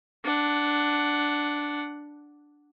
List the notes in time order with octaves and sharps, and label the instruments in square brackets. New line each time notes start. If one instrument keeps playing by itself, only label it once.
[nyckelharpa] D4 F#5